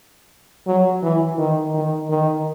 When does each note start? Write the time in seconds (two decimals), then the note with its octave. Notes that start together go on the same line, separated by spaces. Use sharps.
0.67 F#3
1.03 E3
1.38 D#3
1.74 D#3
2.10 D#3